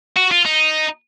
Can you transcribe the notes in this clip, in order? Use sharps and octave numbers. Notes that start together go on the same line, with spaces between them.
F#4
F4
D#4